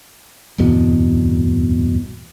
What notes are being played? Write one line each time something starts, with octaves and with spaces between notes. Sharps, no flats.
D1 G1 E2 B2